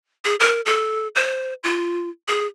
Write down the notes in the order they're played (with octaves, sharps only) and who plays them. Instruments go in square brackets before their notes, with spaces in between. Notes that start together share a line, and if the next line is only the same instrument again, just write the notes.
[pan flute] G#4
A#4
A4
C5
F4
G#4